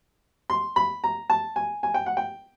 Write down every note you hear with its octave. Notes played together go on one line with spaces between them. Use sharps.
C6
B5
A#5
A5
G#5
G#5
G5
F#5
G5